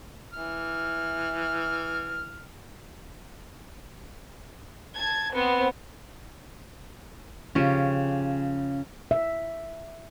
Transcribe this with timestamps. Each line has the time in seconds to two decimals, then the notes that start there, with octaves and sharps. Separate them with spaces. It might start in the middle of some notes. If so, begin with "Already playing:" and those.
0.34 E3 F6
4.97 A5 G#6
5.33 B3 C4
7.55 C#3 F3 C#4 G4
9.11 E5